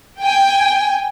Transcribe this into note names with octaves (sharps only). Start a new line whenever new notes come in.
G5 G#5